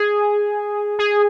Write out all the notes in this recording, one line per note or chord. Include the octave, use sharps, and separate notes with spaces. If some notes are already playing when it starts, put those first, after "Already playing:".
Already playing: G#4
G#4